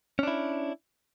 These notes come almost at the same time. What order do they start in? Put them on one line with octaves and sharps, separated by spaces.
C#4 D4 E4